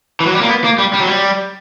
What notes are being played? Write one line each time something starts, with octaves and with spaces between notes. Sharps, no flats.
E3
F#3
G3
A#3
B3
A#3
G3
G3
F#3
G3